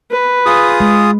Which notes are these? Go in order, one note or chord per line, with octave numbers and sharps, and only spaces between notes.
B4
F4 G#4 D#6
G#3